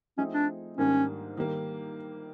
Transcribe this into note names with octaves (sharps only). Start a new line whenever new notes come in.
F3 A3 C4 C#4 D#4 G#4
D4
G#2 D#3 G3 A#3 C#4 D4
D#3 G3 A#3